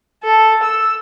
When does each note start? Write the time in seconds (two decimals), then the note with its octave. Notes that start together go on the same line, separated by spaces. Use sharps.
0.24 A4
0.63 E6